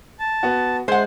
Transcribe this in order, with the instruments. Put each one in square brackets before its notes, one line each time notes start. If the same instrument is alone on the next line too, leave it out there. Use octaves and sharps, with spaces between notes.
[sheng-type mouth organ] A5
[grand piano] B3 F#4
[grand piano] G#3 [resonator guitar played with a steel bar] C5 F#5